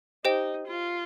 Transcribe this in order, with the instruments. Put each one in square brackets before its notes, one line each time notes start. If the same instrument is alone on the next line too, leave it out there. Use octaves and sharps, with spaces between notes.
[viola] D#4 [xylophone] G4 C5 D#5 G5
[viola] F4